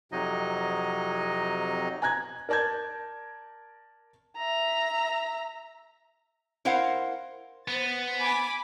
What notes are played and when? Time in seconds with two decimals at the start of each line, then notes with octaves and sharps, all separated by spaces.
0.12 F2 C3 F#3 D#4 D#5
2.02 G#5 A#5 F#6 G#6
2.49 A#4 D5 A5 G6 G#6
4.37 E5 A#5
6.65 E4 A#4 C5 F5 F#5
7.68 B3 C5 A6
8.18 G#5 B5 D6